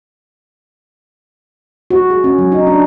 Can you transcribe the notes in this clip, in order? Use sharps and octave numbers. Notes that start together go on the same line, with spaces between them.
F#4
G#4
C#4
F#3
D#4
D4